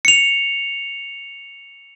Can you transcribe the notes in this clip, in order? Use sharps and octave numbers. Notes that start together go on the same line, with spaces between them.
C#7 F7